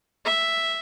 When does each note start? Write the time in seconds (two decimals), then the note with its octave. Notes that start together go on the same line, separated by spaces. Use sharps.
0.25 E5